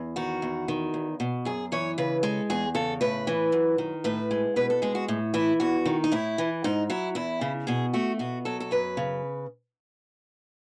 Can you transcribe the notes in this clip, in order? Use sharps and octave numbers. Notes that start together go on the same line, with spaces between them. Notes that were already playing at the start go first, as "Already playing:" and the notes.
Already playing: E2
D#3 F#4
E2
D#3
E2
B2
F#2 G#4
E3 C#5
C#3 B4
G#3 A4
E2 G#4
C#3 A4
A2 B4
E3
F#2
D#3
A2 B4
G#3
B2 B4
A4
G#3 G#4
F#4
A2
E3 E4
E2 F#4
D#3
D#4
A2 E4
E3
G#2 D#4
F#3 E4
E2 E4
C#3
B2 G#4
A3 F#4
B2 F#4
F#3 A4
A4
F#2 B4
C#3